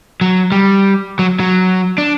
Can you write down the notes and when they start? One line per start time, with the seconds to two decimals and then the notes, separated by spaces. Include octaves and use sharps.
0.21 F#3
0.52 G3
1.19 F#3
1.40 F#3
1.98 D4